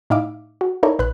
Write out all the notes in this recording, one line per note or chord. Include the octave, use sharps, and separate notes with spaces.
A2 D#4 E4 E5 F5 D6
F#4
D#4 E4 A4 A#4 C#5 D5
A#1 B4 B5 F#6